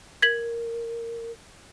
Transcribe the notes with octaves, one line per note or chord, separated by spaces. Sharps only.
A#4 G#6 B6 F#7